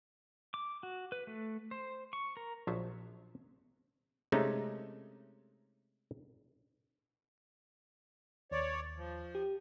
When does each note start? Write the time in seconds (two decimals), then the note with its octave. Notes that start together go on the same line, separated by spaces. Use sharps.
0.54 D6
0.83 F#4
1.12 B4
1.27 A3
1.71 C5
2.13 C#6
2.37 A#4
2.67 A#1 F3 F#3 C5 E5 A5
4.32 C3 G#3 A3 C#4 D#4
8.51 D#2 C#5 D5
8.97 F3
9.35 G4